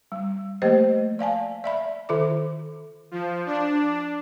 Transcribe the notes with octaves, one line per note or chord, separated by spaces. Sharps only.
G3
F3 A3 A#3 G4 C5 D#5
D5 F5 G#5 A5
D5 E5 B5
D#3 F4 A4 E5 D6
F3
D4